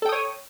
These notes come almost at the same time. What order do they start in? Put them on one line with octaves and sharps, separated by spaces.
A4 G5 D#6 C#5